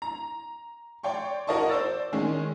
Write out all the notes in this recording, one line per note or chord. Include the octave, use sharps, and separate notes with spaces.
A#5
C#5 D5 G5 C6 C#6
F#4 A#4 C#5 D#5 A5 C#6
C5 D5 E6 A6
D#3 G#3 C#4